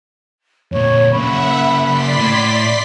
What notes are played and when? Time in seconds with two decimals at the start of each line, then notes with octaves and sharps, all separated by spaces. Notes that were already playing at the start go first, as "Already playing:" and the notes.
0.72 F2 A#2 C#5
1.13 C#3 A#3 E5 F#5 B5
1.83 D5 C6 B6
2.18 A2